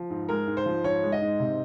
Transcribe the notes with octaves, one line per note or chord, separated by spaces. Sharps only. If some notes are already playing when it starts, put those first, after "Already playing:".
Already playing: F3
G#2
G#3 A#4
G#2
C5
F3
G#2 C#5
G#3
D#5
G#2
C3